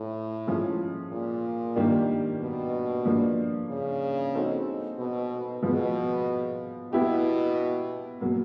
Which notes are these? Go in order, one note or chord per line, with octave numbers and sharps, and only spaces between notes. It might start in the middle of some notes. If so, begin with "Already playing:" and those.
Already playing: A2
F3 G#3 C#4 F4 G#4
A#2
D#3 G3 A#3 D4 G4
B2
F3 A#3 D4
C#3
C4 D#4 F#4 A4 C5
B2
B2 F3 G#3 B3
B2 B3 E4 G4
B2 F#3 A#3